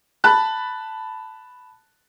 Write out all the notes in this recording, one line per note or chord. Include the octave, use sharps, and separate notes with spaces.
A5 B5 F#6